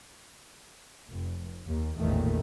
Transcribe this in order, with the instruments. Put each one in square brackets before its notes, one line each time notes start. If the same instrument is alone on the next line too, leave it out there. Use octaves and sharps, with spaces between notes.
[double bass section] F1
D#2
A1 E2 A#2 D#3 A3